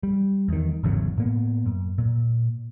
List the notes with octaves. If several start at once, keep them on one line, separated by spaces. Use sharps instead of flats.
G3
E2 D#3
G#1 E2 C#3 F#3
A2 A#3 B3
F#2
A#2